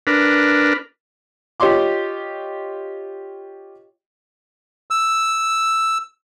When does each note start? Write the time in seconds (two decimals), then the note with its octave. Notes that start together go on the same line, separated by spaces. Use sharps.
0.07 D4 A#4 B4
1.60 F4 G4 C#5 D#5 C6 D6
4.91 E6